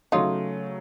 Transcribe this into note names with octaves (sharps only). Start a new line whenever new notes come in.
C#3 F#3 A3 D#4 F4